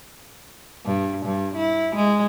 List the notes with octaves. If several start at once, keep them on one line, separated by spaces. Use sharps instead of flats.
G2
G2
E4
G#3